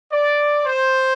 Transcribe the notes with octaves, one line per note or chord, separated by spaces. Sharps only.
D5
C5